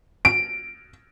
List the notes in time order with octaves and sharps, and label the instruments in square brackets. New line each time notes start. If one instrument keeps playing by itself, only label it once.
[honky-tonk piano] D7